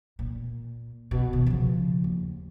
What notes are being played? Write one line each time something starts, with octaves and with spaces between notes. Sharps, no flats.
A#2
B2
D#3
C#3 F3
D#2